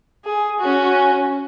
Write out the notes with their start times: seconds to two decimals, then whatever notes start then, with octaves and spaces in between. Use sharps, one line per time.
0.25 G#4
0.60 C#4 F#4